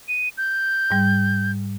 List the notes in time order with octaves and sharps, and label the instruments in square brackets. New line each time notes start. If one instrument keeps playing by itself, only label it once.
[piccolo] D#7
G6
[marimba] G#2 G3